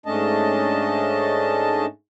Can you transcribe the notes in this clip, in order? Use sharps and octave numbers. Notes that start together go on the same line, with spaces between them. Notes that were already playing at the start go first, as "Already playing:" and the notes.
G#2 A3 C#4 D4 D#5 A5